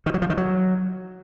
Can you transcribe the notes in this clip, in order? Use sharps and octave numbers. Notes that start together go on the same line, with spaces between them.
D#3
F#3
F3
D#3
F#3